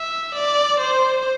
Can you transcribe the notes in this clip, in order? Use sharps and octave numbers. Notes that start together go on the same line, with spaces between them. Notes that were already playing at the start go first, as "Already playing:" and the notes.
Already playing: E5
D5
C5